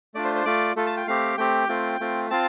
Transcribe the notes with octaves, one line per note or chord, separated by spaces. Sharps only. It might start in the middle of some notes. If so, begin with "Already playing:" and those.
A3 D4 F4 D5
C5
C5
A3 F4 D5
A3 F4 A4
A5
G5
A3 C4 G4 F5
A3 C4 G4 G5
A3 C4 F4
A3 C4 F4
C4 F4 A5